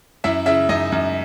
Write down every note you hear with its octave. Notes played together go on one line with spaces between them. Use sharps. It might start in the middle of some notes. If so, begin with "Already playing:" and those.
F#2 E4 E5
C#3 E4 E5
F#2 D#4 D#5
F#2